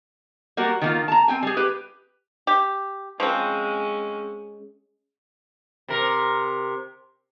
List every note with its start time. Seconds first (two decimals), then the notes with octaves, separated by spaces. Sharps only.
0.57 G3 A#3 F#4 A#4
0.81 D#3 A#3 F4
1.08 A5 A#5
1.28 C4 G5 G#5
1.43 G3 G#4
1.57 G4 B4
2.47 G4
3.20 F3 F#3 G#3 C4 C#4
5.88 C3 A#4